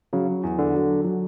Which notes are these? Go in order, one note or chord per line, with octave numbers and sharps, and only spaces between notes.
C#3 F#3
E2
D3
F#3
F#3